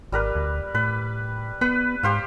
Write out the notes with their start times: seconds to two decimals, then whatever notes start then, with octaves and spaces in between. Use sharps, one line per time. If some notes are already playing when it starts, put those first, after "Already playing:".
0.12 G#1 G3 A#4 B4
0.35 D2
0.75 A2 B4
1.61 B3 B4
2.03 G#2 G4 C5 F5